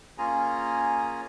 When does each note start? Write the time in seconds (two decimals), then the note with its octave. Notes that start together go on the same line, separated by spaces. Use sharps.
0.18 A#3 C#4 F4 G#4 G#5 A#5